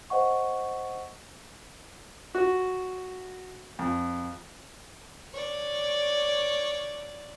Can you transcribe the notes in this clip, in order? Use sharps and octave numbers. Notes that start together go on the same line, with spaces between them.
C5 D#5 F#5 C#6
F#4
F2
C#5 D5